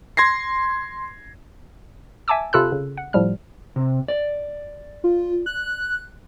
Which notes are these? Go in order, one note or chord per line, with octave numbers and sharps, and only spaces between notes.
C6 G#6 A#6 C7
E5 G#5 A5 D6 E6
C3 F4 A4 B5 E6 F#6
C#3
F#5
A2 F3 G3 F6
C3
D5
F4
F#6